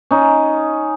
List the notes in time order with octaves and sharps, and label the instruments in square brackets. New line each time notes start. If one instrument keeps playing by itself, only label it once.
[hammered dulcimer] C#4 D#4